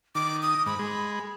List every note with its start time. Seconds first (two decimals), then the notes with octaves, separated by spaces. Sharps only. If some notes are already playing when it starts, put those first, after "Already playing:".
0.15 D#3 D6
0.43 D#6
0.66 G#2 B5
0.79 G#3